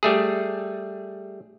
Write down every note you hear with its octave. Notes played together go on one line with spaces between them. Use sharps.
G3 A3 G#4